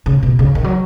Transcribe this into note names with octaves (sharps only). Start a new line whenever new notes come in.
C#3
B2
C#3
D#3
F#3